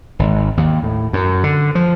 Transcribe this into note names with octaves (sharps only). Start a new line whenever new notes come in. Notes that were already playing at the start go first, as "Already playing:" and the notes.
G#1
D#2
A2
F#2
D3
F3